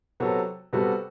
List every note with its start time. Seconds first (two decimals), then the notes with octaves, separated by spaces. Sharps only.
0.20 C3 F#3 B3 F#4 A4
0.73 C3 G3 B3 F#4 A4